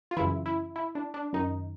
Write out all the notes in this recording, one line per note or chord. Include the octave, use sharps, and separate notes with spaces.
F4
F#2 C#3 E3 E4
E4
E4
D4
D4
F#2 D#3 D#4